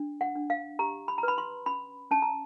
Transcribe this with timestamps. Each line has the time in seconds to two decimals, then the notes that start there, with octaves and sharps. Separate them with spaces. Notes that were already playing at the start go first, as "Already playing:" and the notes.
Already playing: D4
0.21 F#5
0.36 D4
0.50 F5
0.79 G4 A#5
1.08 B5
1.18 A#5
1.23 B4 B5
1.38 C6
1.66 C#4 B5
2.11 C#4 A5
2.22 A#5